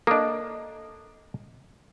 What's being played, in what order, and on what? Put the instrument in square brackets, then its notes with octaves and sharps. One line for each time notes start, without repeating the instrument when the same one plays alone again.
[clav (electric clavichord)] A#3 D4 [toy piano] A4 D#5